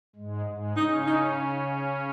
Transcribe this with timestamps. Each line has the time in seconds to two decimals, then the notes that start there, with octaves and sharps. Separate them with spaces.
0.16 G#2 G#3
0.46 G#2 G#3
0.76 C#3 C#4 D#4
1.06 D#4